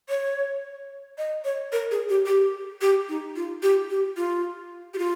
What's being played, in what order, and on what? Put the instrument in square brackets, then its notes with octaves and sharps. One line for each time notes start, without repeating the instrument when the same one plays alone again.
[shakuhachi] C#5
D#5
C#5
A#4
G#4
G4
G4
G4
D#4
F4
G4
G4
F4
G4
F4